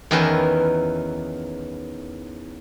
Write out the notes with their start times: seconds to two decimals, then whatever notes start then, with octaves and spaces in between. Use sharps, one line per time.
0.11 E2 D#3 E3 C#4 A#4 B4